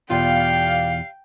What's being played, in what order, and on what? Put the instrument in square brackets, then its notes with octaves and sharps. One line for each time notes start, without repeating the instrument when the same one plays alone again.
[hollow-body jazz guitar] E2 B2 F4 [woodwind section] G4 D5 F5 [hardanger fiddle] G5